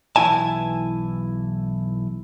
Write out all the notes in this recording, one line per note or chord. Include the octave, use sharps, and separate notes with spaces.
B1 E3 D#4 E4 G#5 A5